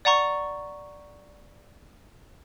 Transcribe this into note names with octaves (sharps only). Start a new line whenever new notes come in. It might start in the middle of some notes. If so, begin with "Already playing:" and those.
D5 F#5 A#5 C#6